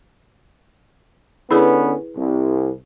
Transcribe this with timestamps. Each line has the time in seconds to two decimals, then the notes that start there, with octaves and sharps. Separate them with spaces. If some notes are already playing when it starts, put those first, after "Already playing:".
1.51 D3 B3 C#4 E4 G#4 B4
2.16 C2